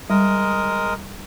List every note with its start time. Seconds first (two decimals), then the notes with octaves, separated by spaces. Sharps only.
0.10 G3 G#3 A#4 D#6